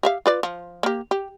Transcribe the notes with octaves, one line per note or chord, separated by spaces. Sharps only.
G4 E5 F5
F4 B4 D5
F3
A#3 G4
G4